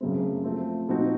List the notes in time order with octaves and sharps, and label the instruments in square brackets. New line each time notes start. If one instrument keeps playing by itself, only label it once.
[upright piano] F#2 C#3 F#3 A3 C4
F3 A3 C4
A#2 F3 C4 D#4 F#4